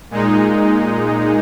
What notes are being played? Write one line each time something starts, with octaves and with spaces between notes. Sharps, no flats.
A#2 G#3 D#4